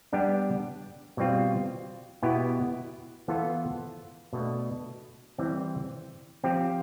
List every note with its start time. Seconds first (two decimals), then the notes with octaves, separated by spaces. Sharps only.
0.12 G3 B3 D4 G4
1.17 B2 G3 C4 F4
2.22 B2 B3 E4 G4
3.28 E3 B3 F4 A4 C5
4.33 B2 A3 D4 A4
5.38 E3 G3 C4 G4
6.44 F3 C4 G4